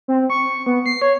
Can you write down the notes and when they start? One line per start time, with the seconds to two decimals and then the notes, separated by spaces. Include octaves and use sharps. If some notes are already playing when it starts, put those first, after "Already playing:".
0.08 C4
0.30 C#6
0.66 B3
0.86 C7
1.02 C#5